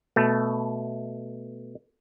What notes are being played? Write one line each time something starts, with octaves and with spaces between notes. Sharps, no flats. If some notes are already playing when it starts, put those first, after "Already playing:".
B2 A3